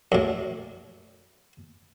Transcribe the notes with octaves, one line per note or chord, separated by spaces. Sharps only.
F#2 A2